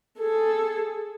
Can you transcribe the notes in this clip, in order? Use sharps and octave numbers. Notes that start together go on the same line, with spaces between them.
G#4 A4